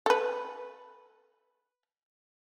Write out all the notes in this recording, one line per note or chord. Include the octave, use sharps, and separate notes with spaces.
A4 B4